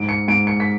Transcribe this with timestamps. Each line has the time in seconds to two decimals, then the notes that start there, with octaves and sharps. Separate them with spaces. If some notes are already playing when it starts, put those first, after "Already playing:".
Already playing: G#2 D7
0.09 C#7
0.28 G#2 D7
0.47 C#7
0.60 B6